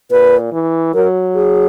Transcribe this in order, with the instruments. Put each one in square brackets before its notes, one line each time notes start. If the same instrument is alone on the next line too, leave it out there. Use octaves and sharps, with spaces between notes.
[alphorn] A#2 [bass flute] B4
[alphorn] E3
[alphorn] F#3 [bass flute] A#4
[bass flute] G#4